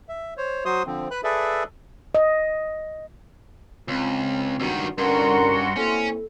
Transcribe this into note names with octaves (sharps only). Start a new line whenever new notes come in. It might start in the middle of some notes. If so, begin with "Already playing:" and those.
E5
C5 C#5
F#3 F#4 C5 C6 D#6
D3 F3 C4
B4 B5 F#6
G#4 A4 B4 D5 E5
D#5
C#2 C4
C#2 G2 D#3 F#4
C2 G2 D3 C#4 F#4 A#4 C6
A#3 C4 C#4 E4 A4